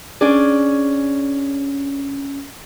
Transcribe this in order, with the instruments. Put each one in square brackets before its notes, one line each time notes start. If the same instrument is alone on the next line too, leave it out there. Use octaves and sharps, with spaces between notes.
[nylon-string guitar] C#4 D4 G#4 D5